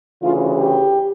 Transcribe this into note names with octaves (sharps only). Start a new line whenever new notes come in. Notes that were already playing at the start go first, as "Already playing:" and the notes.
D2 C#3 E3 F4
G4